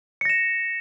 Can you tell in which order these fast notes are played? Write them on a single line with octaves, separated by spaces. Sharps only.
C#7 A#6 E7